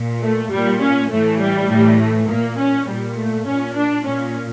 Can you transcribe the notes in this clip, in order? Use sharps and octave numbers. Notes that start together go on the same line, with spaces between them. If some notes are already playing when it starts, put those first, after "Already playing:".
Already playing: A#2
A3
A#2 G3
C#4
A2 E3 A3
G3
A2 E3
A3
A#2 A#3
C#4
A#2 G3
A3
A#2 C#4
D4
A#2 C#4